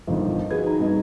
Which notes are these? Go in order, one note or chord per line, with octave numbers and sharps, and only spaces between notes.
G1 F2 D#3
F#4 G#4 B4 G#6
D#4 A#5
G2 C4 D#5 A#5